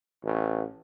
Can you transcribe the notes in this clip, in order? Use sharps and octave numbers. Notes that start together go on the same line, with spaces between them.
A1